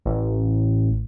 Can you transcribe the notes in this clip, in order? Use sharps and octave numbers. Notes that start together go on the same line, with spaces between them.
A1